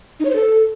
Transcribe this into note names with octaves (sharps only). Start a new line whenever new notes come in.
D#4
C#5
C5
A4